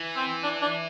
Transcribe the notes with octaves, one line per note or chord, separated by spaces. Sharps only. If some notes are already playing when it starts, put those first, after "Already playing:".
Already playing: E3
C4
D4
D4